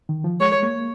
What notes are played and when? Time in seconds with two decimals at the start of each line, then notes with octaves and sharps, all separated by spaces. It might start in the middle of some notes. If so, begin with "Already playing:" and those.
0.09 D#3
0.24 F3
0.40 G#3 C#5
0.63 A#3